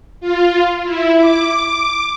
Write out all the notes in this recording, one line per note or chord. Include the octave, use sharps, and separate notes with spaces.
F4
E4
D6